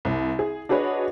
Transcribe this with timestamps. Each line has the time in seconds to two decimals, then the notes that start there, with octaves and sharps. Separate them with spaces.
0.05 C2
0.39 G#4
0.69 D4 F#4 G#4 B4 C#5 D#5